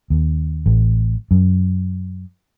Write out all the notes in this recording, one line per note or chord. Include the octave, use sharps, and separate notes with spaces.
D#2
A1
F#2